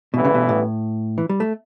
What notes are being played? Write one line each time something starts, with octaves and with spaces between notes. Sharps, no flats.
A1 G2 B2 E3 B3
C#3
B2
A2
E3
G3
A3